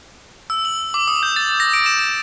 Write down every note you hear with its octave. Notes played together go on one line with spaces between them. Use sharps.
E6
F#7
D6
D#6
G6
A6
A#6
D7
E7
E7